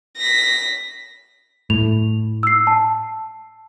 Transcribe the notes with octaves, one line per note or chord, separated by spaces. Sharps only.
A#6 B6
A2 F7
E6 C7
A5